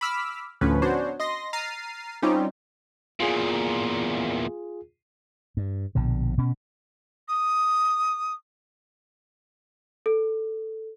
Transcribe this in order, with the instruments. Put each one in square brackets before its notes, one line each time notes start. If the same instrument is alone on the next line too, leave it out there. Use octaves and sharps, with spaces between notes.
[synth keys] B5 D6 E6 F6 B6
D2 A2 D3 F3 C#4 B4
B3 C#4 D4 F#4 C5 C#5
D#5 C6 A#6
A#5 F6 A6 C7 D#7
G3 C4 C#4 D#4 F4 G4
[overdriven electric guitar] E2 A#2 [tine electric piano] F4 G#4
[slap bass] G2
A#1 B2 D3
B2 C#4
[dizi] D#6
[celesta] A4